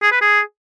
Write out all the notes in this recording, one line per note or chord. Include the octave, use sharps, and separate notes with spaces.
G#4
B4
G#4